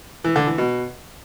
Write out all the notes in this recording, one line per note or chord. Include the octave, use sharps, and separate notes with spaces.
E3
D3
E3
B2